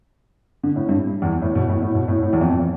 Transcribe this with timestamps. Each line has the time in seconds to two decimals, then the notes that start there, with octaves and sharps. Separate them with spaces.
0.63 D3
0.76 A2
0.89 G2
1.22 E2
1.42 A2
1.55 B2
1.69 A2
1.82 A2
1.95 B2
2.08 A2
2.22 A2
2.33 E2
2.41 F2